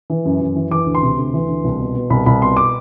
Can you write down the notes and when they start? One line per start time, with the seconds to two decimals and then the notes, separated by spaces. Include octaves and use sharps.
0.10 E3
0.25 F#2
0.41 F#2
0.56 E3
0.71 E3 D6
0.86 D2
0.95 C6
1.03 C3
1.17 D2
1.34 E3
1.48 D2
1.64 C2
1.79 B2
1.95 B2
2.10 C2 B5
2.26 C2 B5
2.42 B2 C6
2.57 D6